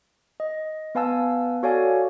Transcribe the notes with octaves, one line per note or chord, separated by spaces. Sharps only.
D#5
B3 B4 F5 G#5 A5 E6
F#4 A4 C#5 D5 F5 G#5